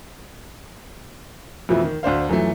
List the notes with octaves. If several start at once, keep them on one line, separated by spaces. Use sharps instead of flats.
F2 B2 E3 F3 A3 E4
D#3
D2 D4 C5 F5
F#2 E3 F3 A3